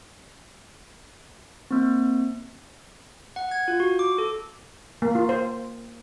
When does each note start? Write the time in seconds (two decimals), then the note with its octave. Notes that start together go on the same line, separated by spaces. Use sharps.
1.71 A#3 C4
3.36 F#5
3.51 G#6
3.68 F4
3.80 F#4
3.99 D6
4.18 A4
5.02 A#3
5.15 F4
5.29 C5